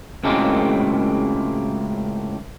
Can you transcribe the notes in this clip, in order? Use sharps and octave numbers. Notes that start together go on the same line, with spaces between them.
C#2 F#2 A2 G#3 A#3 C4